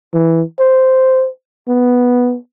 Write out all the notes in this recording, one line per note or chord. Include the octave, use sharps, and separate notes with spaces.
E3
C5
B3